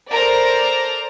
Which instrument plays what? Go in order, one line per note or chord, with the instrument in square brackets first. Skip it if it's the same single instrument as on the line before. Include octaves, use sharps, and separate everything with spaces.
[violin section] A4 A#4 C5 D5 A#5